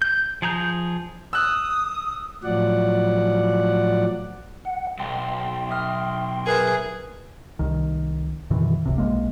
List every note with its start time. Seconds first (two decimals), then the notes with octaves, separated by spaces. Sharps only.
0.02 G6
0.42 F3 G#4 A#5 G6
1.33 D#6 E6 F#6
2.44 A2 F3 F#3 D5 F#5
4.65 F#5
5.00 B1 G5 C6
5.70 E5 D#6 F6
6.47 G#4 A#4 B4 E5
7.59 C2 D#3
8.50 F#2 B2 D#3 E3
8.86 F#1 C#2 C3
8.98 B1 G#3 A#3